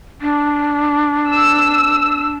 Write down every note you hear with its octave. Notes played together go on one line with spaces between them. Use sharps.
D4
E6